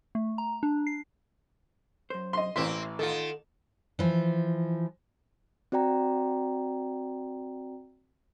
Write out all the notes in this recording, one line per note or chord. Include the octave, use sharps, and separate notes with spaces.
A3
A#5
D4
C7
F#2 C5
D#5 C6
A1 E3 A#3 C4 C#5 E5 C6
D#3 F4 A4 F#5
E3 F3
C4 F#4 D5 G5 A#5